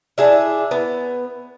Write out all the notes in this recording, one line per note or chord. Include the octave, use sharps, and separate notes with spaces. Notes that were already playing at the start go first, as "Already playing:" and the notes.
D4 E4 G#4 E5
B3